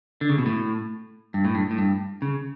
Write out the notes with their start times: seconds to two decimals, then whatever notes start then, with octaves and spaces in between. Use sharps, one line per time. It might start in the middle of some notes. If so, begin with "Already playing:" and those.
0.21 D3
0.29 C#3
0.38 B2
0.46 A2
1.34 G2
1.45 A2
1.55 G2
1.71 A2
1.78 G2
2.22 C#3